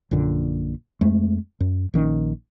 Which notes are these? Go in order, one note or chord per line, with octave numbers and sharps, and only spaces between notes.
A#1 F#2 A#2 D3
F2 G#3 A3
F#2
A#1 D#3 C#4